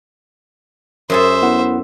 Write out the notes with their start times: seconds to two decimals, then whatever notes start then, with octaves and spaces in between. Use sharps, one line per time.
1.10 F#2 G#4 A4 C5 E5
1.42 B3 E4 F#5